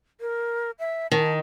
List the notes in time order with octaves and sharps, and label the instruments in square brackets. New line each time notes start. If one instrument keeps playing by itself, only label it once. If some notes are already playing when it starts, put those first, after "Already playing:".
[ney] A#4
E5
[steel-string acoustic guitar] D#3 [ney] A5